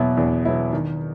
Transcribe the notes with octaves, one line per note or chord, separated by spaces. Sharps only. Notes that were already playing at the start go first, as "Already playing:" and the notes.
Already playing: E2 B2 F#3 B3 E4
E2
B2 F#3 B3 E4
D#3